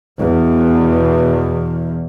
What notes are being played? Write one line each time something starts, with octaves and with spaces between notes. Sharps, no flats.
E2 B2